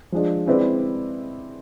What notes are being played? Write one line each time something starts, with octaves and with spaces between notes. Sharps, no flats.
F3 G#3 D4
G#3 C4 E4 B4 D5